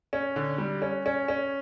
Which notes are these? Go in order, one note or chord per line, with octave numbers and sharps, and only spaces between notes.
C#4
D3
G3
C#4
C#4
C#4